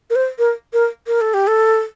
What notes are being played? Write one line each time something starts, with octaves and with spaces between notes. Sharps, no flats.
A#4
C5
A#4
A#4
A#4
A4
G4
A4